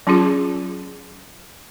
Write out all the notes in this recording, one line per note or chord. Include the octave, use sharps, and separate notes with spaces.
F#3 C#4 F4 G#4